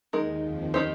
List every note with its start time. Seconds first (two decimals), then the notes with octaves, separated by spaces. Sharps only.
0.13 D#2 D#3 G#3 D#4 A#4
0.43 F2 F3
0.74 D#3 G#3 D#4 G4 C5